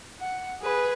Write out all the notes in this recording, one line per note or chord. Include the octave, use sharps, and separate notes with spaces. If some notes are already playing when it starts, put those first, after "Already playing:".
F#5
G#4 B4